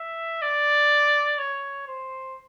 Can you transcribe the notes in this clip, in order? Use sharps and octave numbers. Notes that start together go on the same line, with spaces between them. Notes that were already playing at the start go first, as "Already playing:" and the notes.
Already playing: E5
D5
C#5
C5